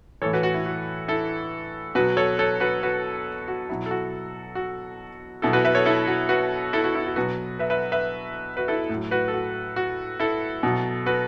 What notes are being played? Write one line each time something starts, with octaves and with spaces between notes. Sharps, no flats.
A2 E3 A4 C#5
F#4 B4
F#4
E4
F#4
E4 A4
B2 F#3 F#4 B4
A4 C#5
A4 C#5
F#4 B4
F#4 B4
F#4
B2 F#3 E4
A4
F#4
F#4
B2 F#3 E4 A4
F#4 B4
B4 E5
A4 C#5
E4 A4
F#4
F#4 B4
E4 A4
F#4
E4
F#4
B2 F#3 F#4 B4
B4 E5
B4 E5
B4 E5
F#4 B4
E4 A4
A2 F#3
F#4 B4
A4
F#4
F#4
E4 A4
B2 F#3
F#4 B4